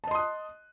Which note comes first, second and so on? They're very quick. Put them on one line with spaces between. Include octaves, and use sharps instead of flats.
A5 D#5 C6 D#6 F#6